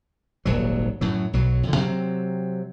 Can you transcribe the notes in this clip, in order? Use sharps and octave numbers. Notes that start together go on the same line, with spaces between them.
D#1 G#1 F#3
F#2 A2 F#3
B1 F#3
F2 D3
C3 F#3 C4